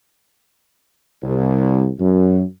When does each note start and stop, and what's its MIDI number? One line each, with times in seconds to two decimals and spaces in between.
1.22 1.87 36
1.99 2.42 42